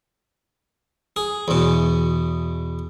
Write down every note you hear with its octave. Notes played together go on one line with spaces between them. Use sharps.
G#4
E2 B2